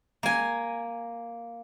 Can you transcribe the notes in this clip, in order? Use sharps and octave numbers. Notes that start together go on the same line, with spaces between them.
A#3 G#5